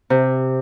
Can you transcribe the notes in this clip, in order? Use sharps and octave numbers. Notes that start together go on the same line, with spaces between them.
C3